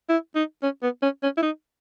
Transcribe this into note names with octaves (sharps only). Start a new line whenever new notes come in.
E4
D#4
C#4
B3
C#4
C#4
E4
D#4